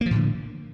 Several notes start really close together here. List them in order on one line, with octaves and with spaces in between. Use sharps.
A#3 F3 A2 D3